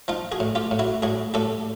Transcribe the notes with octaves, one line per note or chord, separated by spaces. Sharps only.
F3 D#4 F4
F#4 G#4
A2
F4 G4
A2
E4 F#4
A2 F#4 G#4
A2 G4 A4